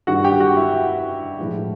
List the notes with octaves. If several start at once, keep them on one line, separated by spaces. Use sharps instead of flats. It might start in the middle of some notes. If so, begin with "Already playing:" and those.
G2 D#3 G3 F#4 F#5
G4 G5
F#4 F#5
E4 E5
A2 F3 G#3